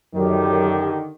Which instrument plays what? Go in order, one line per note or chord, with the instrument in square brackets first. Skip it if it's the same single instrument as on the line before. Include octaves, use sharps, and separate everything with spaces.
[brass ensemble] F#2 [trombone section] D3 D#3 [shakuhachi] G4